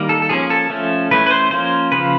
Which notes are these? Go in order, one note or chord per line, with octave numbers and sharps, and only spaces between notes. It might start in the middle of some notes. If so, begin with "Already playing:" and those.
Already playing: D#3 G3 A#3
A4
A4
F3 A#3 C#4 G#4
A4
F3 A3 C#4
E3 A3 C#4 B4
B4
C5
F3 A#3 C#4 C5
C#3 F3 A#3 B4